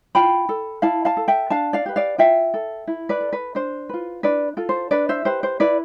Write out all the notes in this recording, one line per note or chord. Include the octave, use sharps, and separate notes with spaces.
F4 G5 B5
A4
E4 F5 A5
F5 A5
A4
E5 G5
D4 F5 A5
D5 F5
G4 B4
D5 F5
F4 E5 G5
A4
E4
B4 D5
A4
B4
D4 C5
F4 B4
D4 B4 D5
F4 A4
C5
D4 B4 D5
C5 E5
G4 B4 C5
C5
E4 B4 D5